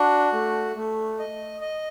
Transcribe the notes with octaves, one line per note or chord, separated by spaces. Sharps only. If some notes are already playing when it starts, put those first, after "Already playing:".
Already playing: D4 F#4
A3
A3
D#5
D#5